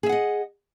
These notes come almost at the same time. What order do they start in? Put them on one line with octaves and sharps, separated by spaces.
G#4 E5 F#5 D#5